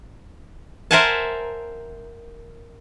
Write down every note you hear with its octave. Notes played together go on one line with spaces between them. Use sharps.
A#4 C5 E5 F#5 G#5 A5